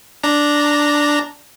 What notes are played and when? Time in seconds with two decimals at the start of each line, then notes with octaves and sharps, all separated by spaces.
0.23 D4 A#5